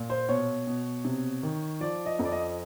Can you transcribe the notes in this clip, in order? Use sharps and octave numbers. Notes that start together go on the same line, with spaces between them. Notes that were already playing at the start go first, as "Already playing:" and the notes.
Already playing: A#2
C5
B2 C#5
B2
C3
D#3
F3 D5
D#5
F2
D5
D#5